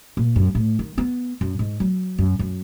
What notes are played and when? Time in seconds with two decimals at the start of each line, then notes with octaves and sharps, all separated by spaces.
0.17 A#2
0.36 F#2
0.55 A2
0.79 D#3
0.98 B3
1.41 F#2
1.59 G#2
1.80 F#3
2.18 F#2
2.39 F#2